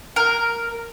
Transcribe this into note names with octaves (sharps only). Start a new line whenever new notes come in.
A#4